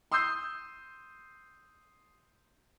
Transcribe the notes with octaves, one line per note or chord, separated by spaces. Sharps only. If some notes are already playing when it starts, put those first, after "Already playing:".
C6 D#6 E6 G6 C7